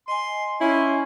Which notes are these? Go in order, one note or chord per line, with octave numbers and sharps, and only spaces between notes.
D#5 G#5 C6
C#4 E4 C6